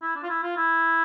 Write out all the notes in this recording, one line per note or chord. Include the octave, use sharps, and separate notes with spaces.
E4
D4
F4
E4
F4
E4